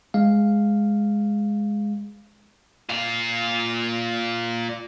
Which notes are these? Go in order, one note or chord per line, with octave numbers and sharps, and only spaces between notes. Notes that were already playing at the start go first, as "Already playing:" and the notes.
G#3 F5
A#2 F5